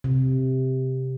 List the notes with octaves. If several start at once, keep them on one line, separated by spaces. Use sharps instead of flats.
C3